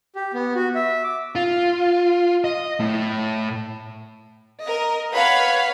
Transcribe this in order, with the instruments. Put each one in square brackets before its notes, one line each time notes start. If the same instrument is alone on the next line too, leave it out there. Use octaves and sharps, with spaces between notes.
[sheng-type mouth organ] G4
B3
F#4
E5
D6
[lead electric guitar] F4
D#5
A2
[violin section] A#4 D#5
B4 C#5 F5 F#5 B5